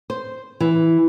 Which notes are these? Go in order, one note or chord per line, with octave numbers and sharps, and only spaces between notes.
C5
E3